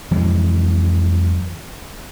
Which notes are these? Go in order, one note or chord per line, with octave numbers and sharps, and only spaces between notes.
F2 E3 F#3 G#3